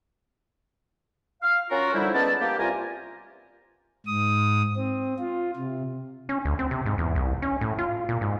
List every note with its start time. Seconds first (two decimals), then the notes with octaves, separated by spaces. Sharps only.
1.42 F5
1.70 C#4 F4 F#4 A#4
1.94 D3 F3 G3 D#4 E4
2.13 G#3 B3 C#4 D5 A5
2.41 A#3 G4
2.58 C2 F4 A#4 G#5
4.06 G#2 D#6
4.76 C4
5.19 F4
5.56 C3
6.29 C#4
6.45 D2
6.59 C4
6.71 C3
6.86 G#2
6.98 E2
7.15 C2
7.42 C#4
7.61 A2
7.79 F4
8.09 A#2
8.21 G#2